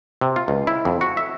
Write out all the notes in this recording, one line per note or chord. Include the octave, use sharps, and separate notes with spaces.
C3
F4
C#2
E4
F2
F#4
E5